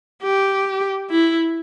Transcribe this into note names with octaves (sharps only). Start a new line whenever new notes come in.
G4
E4